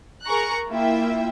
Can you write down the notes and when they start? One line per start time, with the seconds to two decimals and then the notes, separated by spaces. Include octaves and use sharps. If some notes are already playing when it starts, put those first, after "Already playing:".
0.25 G#4 A#4 A#5 C#6 F#6
0.70 A#3 E4 F4 E5 G5